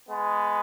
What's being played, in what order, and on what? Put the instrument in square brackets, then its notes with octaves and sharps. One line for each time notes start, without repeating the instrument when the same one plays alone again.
[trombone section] G#3 B3